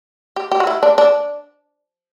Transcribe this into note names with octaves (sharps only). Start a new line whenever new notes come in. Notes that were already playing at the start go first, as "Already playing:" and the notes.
G4
G4
F#4
E4
D4
D4